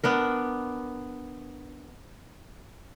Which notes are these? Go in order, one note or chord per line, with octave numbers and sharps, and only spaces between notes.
B3 D4 A#4